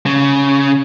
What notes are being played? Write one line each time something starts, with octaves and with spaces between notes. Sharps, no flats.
C#3